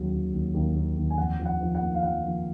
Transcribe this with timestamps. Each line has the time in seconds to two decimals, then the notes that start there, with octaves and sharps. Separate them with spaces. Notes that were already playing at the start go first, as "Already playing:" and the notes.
Already playing: D#2 C#3 F#3
0.12 D#2
0.32 D#2
0.54 D#2
0.75 D#2
0.97 D#2
1.10 G#5
1.17 F2 F#5
1.39 F3
1.45 F#5
1.61 F3
1.75 F#5
1.81 A#3
1.95 F5
2.03 F3 F#5
2.24 F3